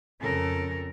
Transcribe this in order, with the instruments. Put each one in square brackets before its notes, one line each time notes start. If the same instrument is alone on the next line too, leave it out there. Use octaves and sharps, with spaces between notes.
[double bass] F2 C#3 [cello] A4 A#4